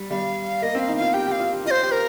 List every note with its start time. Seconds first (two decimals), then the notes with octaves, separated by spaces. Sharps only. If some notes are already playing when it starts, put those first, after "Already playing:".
Already playing: G3
0.10 G3 F5
0.62 A#3 D#5
0.75 C4 F5
0.88 D#4
0.97 F4 F5
1.13 G4 G5
1.27 G4 F5
1.40 F4
1.53 G4
1.66 F4 D#5
1.71 C5
1.83 G4
1.92 A#4